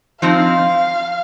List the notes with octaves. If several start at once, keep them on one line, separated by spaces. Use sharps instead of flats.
F3 C4 D#4 F5